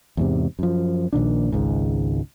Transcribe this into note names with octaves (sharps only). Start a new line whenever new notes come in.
E2 G#2 C3
F#2 F3
A#1 A#2 D#3 D4
G#1 C#2 G#2